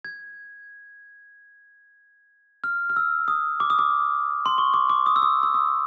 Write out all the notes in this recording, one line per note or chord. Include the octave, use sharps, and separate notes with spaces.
G#6
F6
F6
E6
D#6
D6
D#6
D6
C6
C#6
D6
D6
D#6
E6
D#6
E6
D#6